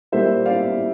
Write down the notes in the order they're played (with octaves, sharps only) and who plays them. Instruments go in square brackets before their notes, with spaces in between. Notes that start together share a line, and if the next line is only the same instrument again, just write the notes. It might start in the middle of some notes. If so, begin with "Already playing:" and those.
[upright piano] A#2 G3 A#3 C5 E5
D5 F5